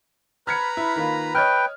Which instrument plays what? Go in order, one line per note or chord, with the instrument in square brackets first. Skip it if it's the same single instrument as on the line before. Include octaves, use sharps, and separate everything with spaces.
[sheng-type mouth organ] B4 A#5 B5 [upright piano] F6 G#6 C#7
[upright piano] E4
D#3 A#3 F4
[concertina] B4 G5 [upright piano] C#5 D#5 F6